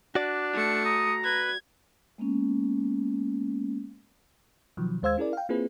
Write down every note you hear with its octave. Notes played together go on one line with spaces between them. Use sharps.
D4 F#4 D5
A3 C#7
A#5 D#6
B4 G#6
G#3 A#3 B3 C#4
B2 D#3 F3 F#3
D#2 G#3 C5 F5 E6 G#6
C#4 E4 G#4 A#4 D5
F5 G5
A#3 C4 E4 F4 G#4 B4